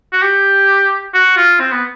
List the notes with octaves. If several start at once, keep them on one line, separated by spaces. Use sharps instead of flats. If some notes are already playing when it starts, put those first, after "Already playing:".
F#4
G4
F#4
F4
C4
B3